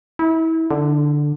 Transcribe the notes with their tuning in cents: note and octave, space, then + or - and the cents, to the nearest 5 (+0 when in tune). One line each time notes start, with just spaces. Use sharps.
E4 -30
D3 +5